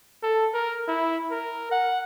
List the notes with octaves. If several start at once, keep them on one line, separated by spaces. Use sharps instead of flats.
A4
A#4
E4
A#4
F#5